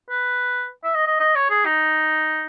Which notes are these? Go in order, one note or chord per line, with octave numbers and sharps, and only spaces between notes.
B4
E5
D#5
D#5
D#5
C#5
G#4
D#4